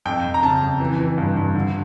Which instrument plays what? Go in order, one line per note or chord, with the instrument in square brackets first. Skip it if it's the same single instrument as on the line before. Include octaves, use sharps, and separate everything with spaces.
[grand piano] F2 G5
F2
A#5
C#3 A5
F2
E3
E3
G2
G2
D3